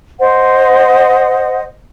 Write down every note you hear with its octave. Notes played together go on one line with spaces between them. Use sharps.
C5 D#5 F#5